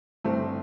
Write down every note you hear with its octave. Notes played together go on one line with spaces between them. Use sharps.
G1 A3 C4